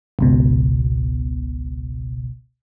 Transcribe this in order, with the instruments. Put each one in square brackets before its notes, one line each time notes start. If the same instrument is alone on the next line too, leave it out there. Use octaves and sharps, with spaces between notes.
[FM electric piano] G#1 C#2 B2